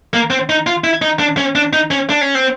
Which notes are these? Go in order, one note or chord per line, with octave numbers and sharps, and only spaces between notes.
A#3
C4
D#4
F4
E4
D#4
D4
C#4
D4
D#4
C#4
D4
C#4
C4